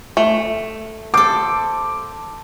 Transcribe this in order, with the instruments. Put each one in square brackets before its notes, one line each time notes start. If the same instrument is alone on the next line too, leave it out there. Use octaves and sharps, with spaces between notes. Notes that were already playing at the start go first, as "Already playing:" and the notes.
[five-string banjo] A3
[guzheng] A4 C5 [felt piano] D6